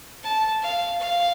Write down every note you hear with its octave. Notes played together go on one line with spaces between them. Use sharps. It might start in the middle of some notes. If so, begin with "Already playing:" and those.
A5
F5
F5